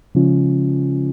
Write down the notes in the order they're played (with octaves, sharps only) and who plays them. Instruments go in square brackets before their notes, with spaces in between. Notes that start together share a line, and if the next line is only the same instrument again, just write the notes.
[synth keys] C#3 F3 G#3 C#4 F4